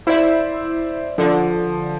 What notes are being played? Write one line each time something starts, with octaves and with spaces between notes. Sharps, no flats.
E4 C5 D5 E5
D3 F3